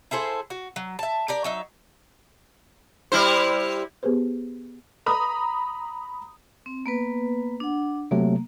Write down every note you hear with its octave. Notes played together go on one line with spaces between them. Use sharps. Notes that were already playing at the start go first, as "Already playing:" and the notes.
E4 G#4 A4 C5
F#4
F#3
E5 A5
G4 A#4 D5
F#3 D#4 E5
G3 E4 C5
B3 G4 G#4 B4 C5
A#5 B5 D#6
C4
A#3 B3 B4
D4 F#5
C3 F#3 A3 A#3